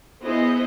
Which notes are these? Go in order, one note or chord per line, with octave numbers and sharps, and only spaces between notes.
B3 E4 G#4 C5 D#5